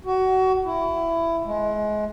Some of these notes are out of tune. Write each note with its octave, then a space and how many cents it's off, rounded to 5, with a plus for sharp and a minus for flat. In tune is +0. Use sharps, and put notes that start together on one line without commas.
F#4 +25
E4 +15
G#3 +30